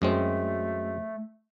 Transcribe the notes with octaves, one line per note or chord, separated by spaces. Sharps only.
F#2 G#3 A3 C4